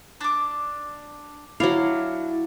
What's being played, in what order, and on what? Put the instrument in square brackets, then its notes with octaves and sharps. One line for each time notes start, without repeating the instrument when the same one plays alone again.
[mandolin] D4 D6
[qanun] F#3 F5 [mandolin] D4 [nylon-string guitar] E4